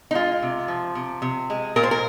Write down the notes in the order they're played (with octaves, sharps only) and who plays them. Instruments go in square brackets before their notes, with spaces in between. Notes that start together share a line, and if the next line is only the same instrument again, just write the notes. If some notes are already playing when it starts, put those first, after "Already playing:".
[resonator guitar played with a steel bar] D#4
G#3 F4
C3
F3
C3
C3
G#3
A#2 A#4
C5
A#4